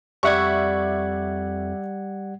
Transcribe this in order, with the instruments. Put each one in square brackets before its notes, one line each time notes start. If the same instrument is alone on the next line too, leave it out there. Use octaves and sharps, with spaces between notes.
[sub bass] F2 [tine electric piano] G3 F#5 G#6 [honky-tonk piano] D5 E5 C#6